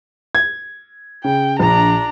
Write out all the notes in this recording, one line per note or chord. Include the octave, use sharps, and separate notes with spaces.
G#6
C#3 G5
A#1 D4 A#5